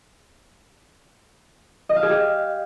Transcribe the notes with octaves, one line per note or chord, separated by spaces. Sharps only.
D#5
F5
G#4
G4